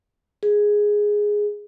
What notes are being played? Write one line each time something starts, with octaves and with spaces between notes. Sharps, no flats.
G#4